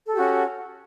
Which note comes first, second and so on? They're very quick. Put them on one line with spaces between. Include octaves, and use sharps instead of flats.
A4 G4 F#4 C#4